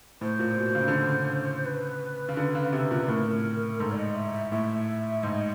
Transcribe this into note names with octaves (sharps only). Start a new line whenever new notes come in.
A2 C5
A#2
B2
C#3
D3
C#3
B4
C#3
D3
C#3
C3
A#2
A2 A#4
G#2 A4
D5
D#5
E5
E5
A2 E5
G#2 D#5